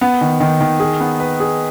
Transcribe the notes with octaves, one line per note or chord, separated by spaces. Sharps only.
B3
D#3
D#3
D#3
G#4
B3
B4
G#4